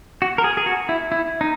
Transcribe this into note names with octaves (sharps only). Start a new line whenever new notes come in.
F#4
A#4
G#4
G#4
F#4
E4
E4
D#4